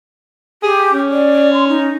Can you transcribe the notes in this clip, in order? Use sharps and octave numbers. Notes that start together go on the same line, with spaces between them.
G4 G#4
C#4
D5
C6
D#4